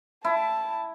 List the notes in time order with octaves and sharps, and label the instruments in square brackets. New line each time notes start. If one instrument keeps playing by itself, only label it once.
[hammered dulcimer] E4 [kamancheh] A5